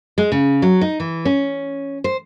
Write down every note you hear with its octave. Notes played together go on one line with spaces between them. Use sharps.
G#3
C#3
F#3
D#4
E3
C#4
C5